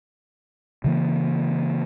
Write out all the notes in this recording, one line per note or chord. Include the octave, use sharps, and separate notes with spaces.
C#3 E3 A#3